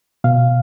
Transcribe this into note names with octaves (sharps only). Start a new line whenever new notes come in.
B2 F5